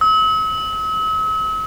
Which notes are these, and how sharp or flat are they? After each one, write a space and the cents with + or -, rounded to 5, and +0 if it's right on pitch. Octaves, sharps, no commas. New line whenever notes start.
E6 -45